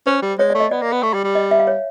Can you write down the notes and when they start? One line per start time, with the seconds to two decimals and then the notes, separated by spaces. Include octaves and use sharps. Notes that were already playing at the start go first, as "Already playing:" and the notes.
0.07 C#4 C5
0.22 G3
0.39 G#3 C#5
0.50 D5
0.55 A3
0.60 D#5
0.71 B3 D5
0.82 A#3
0.92 B3
1.03 A3
1.14 G3
1.24 G3
1.35 D#5
1.51 E5
1.60 F5
1.67 C#5